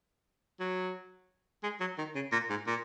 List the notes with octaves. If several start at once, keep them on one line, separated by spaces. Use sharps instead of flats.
F#3
G#3
F#3
D#3
C#3
A#2
G#2
A#2